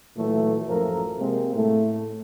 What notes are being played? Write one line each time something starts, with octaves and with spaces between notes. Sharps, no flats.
A#2 E3 F#3 A3
A1 F#2 F3 A4 A#4
C3 G#3 A#3 C4
A2 A3